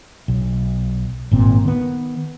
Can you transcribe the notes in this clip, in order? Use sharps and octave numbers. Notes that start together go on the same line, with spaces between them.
B1
G#1 A#2 C4
D#3 B3